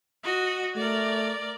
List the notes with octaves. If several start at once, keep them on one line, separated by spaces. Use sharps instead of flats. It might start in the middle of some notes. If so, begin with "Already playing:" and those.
F#4 D#5
A3 A#4 D5